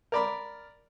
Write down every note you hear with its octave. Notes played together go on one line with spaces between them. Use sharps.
A#4 D5 B5